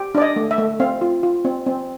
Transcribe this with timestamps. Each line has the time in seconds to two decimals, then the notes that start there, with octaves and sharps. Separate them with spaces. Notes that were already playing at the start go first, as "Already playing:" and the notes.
Already playing: G4
0.15 D4 D5
0.22 D#5
0.36 A3
0.51 E5
0.58 A3
0.80 C4 F5
1.01 F4
1.23 F4
1.45 C4
1.66 C4